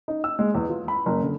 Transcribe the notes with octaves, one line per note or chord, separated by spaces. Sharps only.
D#4
E6
G#3
E2
F4
B5
F#1
D3